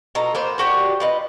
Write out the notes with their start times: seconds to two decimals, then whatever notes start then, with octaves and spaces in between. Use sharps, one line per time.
0.15 B2 F4 A4 A#5
0.35 A#3 B3 C5
0.58 D4 F#4 G4
1.00 F4 B4 D#5